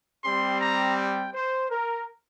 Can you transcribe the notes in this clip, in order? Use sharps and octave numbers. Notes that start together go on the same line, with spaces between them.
G3 C4 G4 C6
A#5
G5
C5
A#4